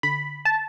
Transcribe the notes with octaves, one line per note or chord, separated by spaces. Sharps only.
D3 B5
A5